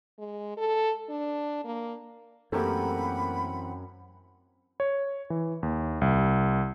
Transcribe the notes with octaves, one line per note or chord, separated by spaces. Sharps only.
G#3
A4
D4
A#3
F#2 E3 A3 A#3 C4 G4 F#5 B5
C#5
E3
D#2
C2